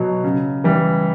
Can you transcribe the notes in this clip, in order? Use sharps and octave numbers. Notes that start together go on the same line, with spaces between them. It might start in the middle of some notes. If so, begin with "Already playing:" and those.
Already playing: B2 F#3
C#3
E3 G3